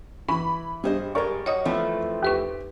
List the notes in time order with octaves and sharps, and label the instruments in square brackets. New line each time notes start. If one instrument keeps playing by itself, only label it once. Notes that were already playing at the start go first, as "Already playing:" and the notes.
[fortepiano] E3 [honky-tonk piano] B5 [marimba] C#6
[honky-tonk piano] G2 G3 [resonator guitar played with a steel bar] G#4 C5 D#5
[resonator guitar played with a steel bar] G#2 G#3 [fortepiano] A#4 D5 C#6
[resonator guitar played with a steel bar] F#4 [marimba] C#5 D#5 D#6
[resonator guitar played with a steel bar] E3 F3 A3 [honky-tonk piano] C4
[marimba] D#2 B4 C#6 [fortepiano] G4